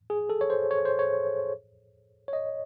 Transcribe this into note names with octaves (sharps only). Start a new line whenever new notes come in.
G#4
A4
C#5
C5
C#5
C5
C#5
C#5
D#5